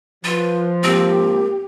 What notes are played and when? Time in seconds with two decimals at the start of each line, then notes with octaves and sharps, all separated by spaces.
0.24 F3 F4 B4
0.83 G#2 A#3 C4 G4